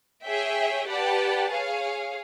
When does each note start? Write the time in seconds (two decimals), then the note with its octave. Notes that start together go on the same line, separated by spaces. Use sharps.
0.24 G#4 C#5 E5 G5
0.88 G4 B4 D5 F#5 A5
1.51 G#4 C#5 F5